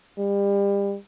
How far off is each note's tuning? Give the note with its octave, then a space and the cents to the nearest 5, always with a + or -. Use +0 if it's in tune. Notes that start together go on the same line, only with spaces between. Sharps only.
G3 +30